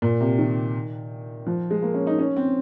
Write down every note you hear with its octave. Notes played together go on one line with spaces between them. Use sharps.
A#2
C3
D#3
F3
G#3
A#3
C#4
D#4
C#4
C4